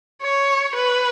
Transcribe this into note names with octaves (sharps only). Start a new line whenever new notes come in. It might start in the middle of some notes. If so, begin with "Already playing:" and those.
C#5
B4